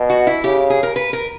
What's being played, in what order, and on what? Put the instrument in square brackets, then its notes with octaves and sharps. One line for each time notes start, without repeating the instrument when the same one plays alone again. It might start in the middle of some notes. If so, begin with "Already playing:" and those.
Already playing: [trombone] B2
[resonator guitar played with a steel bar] F#4
E4
[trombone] C#3 [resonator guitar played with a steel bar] G4
[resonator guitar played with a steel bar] G#4
A#4
B4
A#4